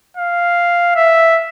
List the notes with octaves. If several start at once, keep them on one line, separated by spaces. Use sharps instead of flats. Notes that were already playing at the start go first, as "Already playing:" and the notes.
F5
E5